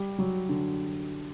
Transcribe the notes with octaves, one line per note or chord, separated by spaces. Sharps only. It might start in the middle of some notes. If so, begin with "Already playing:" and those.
Already playing: G3
F#3
D3